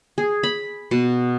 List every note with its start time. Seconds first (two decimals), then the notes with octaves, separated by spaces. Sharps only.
0.18 G#4
0.43 B5
0.91 B2